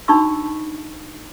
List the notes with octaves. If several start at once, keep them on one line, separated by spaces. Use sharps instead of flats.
D4 D#4 F#4 B5 C#6 E6